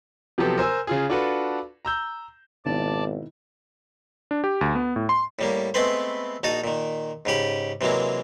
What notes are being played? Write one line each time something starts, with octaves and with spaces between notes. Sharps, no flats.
C3 F3 F#3 B3 G4 A4
A#4 C5 G#5 E6
C#3 F4 G#4
D4 F4 F#4 A4 B4
A#5 E6 G6
G#1 B2 D#3 E4 D5 A5
D4
G4
D2
B3
A2
C6
A2 G3 A#3
G#3 A3 B3 C4 B4 C5
A#1 D#4 F#4 A5 D#6
A#2 D#3
G#2 C#3 G4 B5
C3 E3 F#3 G#3 A#3